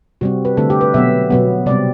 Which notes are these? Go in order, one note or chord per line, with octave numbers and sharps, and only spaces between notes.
C3 G3 C4 F#4
B4
D3 A3 C4 A4
G4
B4
B2 F#3 B3 E5
B2 F#3 B3
C3 G3 C4 D5